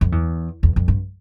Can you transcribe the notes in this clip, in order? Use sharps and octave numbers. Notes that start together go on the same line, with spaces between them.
F2
E2
E2
F2
G2